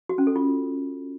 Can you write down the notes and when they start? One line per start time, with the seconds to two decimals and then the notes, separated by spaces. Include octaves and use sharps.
0.09 F#4
0.18 C#4
0.27 A4
0.36 F4